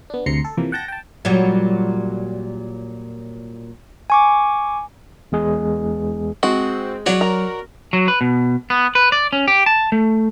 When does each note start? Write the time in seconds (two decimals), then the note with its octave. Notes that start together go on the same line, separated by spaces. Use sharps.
0.10 B3 D4
0.26 D2 C3 A#5 C6 C7 C#7
0.45 A4
0.57 C3 E3 F3 A#3
0.72 F#5 G5 A5 G6 A#6
0.88 G5 A5
1.25 A#2 F#3 G3
4.10 G#5 C#6 D6
5.32 E2 G#3 G#4
6.43 G#3 C4 F#4
7.06 F#3 F#4 C#5 D5
7.21 A#4 A#5
7.93 F#3
8.08 B4
8.21 B2
8.70 B3
8.95 B4
9.12 D5
9.33 C#4
9.48 G4
9.66 A5
9.92 A3